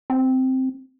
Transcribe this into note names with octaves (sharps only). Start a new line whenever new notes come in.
C4